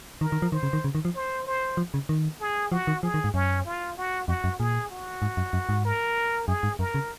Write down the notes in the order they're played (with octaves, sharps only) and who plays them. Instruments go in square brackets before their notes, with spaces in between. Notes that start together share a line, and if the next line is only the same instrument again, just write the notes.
[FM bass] D#3 [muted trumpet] A#4
[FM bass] D#3
F3
[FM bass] D#3 [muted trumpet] C5
[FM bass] C#3
D#3
C#3
D#3
F3
[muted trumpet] C5
C5
[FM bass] F3
C#3
D#3
[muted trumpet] G#4
[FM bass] F3 [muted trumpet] F#4
[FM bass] D#3
[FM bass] F3 [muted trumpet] G#4
[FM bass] D#3
G#2
[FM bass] F#2 [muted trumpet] C#4
[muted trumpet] F4
F#4
[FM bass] F2 [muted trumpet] F#4
[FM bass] F#2
[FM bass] A#2 [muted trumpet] G#4
[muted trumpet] F#4
[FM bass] G#2
F#2
F#2
G#2
[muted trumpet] A#4
[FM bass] F#2 [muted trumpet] G#4
[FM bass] G#2
[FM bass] F#2 [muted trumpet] A#4
[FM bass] C#3